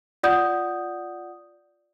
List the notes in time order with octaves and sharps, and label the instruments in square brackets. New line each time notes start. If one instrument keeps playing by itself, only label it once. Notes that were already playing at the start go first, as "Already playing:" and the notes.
[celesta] F4 D5 F#5 D#6 G6